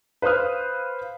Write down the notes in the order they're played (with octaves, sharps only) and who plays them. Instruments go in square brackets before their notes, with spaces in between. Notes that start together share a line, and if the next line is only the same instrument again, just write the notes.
[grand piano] B4 C5 F5 D#6 F6